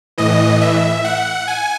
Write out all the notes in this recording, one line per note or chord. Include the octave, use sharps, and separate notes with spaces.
A2 E3 D#5
E5
F#5
G#5